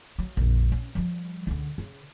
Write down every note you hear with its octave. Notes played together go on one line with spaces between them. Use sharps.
F#3
A#1 F2
C#4
F3 G3
C#2 D3
C#3